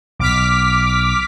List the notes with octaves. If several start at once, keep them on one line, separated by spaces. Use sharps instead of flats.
B1 D6 F6 B6